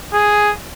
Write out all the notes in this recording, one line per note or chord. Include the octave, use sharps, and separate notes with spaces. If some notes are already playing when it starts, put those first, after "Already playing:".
G#4